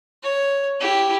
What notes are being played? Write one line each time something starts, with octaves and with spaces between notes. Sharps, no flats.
C#5
E4 G4